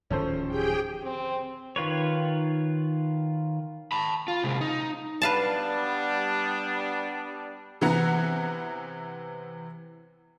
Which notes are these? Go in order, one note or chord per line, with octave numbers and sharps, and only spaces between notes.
D1 D#3 F3 C#4 A4 C5
G4 G#4 G5
C4
D#3 F4 B4 C#5
A5 B5
F4
C3 G#3
D#4
G3 B3 D4 B4 F5 A5
C3 E3 B3 E4 F#5 A#5